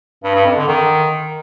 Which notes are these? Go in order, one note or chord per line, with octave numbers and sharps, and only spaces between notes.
G2
G2
F2
D3
D#3